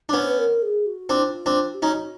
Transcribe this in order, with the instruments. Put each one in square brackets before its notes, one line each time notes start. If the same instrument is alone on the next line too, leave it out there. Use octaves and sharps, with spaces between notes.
[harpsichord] B3 C#4 D4 [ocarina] C#5
[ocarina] C5
B4
A#4
G#4
F#4
[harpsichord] C4 D4 [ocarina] F4
[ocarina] E4
F4
[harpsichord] C4 D4
[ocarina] G4
[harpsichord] C#4 D#4 [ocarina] F#4